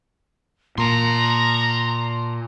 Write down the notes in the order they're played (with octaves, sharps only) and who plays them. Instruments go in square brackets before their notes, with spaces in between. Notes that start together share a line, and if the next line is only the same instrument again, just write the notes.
[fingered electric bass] A#2 [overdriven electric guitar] A5 C6 [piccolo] A#5